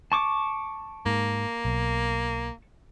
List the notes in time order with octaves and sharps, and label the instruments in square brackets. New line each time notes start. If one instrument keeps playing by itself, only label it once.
[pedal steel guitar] A5 C#6 D6
[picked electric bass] G#2 [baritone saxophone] A#3
[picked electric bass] B1